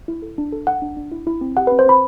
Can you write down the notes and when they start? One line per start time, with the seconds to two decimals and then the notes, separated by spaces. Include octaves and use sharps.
0.08 E4
0.22 A4
0.38 D4
0.52 A4
0.67 A4 F#5
0.82 D4
0.97 D4
1.12 E4
1.27 E4
1.41 C4
1.57 G4 F#5
1.67 C4 B4
1.79 C5
1.86 C4 B5